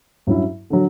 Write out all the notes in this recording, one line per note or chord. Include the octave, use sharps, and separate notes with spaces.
G2 F#3 C#4 E4
D3 F#3